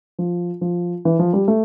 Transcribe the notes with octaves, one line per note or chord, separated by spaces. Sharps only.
F3
F3
E3
F3
G3
A3